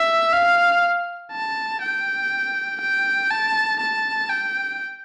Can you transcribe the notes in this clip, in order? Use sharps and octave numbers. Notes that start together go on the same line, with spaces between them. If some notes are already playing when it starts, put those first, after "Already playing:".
Already playing: E5
F5
A5
G5
G5
A5
A5
G5